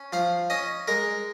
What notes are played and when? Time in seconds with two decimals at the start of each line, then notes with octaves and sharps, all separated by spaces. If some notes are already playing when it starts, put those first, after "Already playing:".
Already playing: C#4
0.13 F3 F5
0.50 C#4 D#5
0.88 G#3 A#4